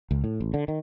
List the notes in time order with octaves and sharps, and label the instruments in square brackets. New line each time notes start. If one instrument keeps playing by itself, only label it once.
[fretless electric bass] C#2
A2
A1
D3
D#3